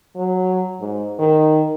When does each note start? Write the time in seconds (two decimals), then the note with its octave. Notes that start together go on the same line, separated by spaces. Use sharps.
0.16 F#3
0.80 G#2
1.19 D#3